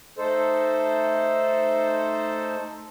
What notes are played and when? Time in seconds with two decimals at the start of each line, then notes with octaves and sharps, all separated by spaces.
0.18 A3 D#4 A4 C5